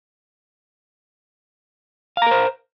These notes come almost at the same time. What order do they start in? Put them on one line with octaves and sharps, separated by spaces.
F5 A#5 A#4 C5